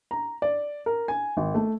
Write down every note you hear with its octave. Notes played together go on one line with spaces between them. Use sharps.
A#5
D5
A#4
G#5
G#1
A3